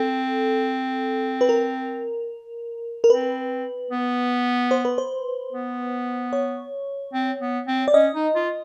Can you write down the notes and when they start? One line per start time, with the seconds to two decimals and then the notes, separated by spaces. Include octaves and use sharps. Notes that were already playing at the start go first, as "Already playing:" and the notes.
Already playing: C4 A4
1.41 B4
1.49 A#4
3.04 A#4
3.10 C4 B4
3.91 B3
4.71 C5
4.85 B4
4.98 C5
5.52 B3
6.33 C#5
7.13 C4
7.41 B3
7.67 C4
7.88 D5
7.94 C#4 D#5
8.14 D#4
8.35 F4